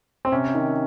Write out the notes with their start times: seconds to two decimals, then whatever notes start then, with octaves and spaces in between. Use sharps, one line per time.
0.25 C4
0.32 C3 C#4
0.54 D#3